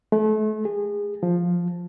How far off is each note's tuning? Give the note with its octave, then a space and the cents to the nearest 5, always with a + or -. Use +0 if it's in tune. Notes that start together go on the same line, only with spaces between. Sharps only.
A3 -35
G#4 -25
F3 +5